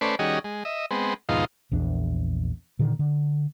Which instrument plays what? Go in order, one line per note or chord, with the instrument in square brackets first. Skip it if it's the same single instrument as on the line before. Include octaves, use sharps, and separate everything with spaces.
[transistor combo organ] A3 C#4 B4 C5 D5
D#3 G3 C#4 F#4 G#4 D#5
G#3
D#5 E5
G#3 B3 C4
D#2 G#2 B2 F3 D#4 F4
[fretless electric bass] A#1 E2 D4
A#2 D3 D#3
D3